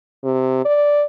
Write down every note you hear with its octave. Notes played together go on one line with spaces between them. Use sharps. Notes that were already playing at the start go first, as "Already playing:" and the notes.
C3
D5